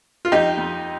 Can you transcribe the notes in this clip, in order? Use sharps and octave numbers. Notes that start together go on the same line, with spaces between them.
F4
F2 D#4 G4
F2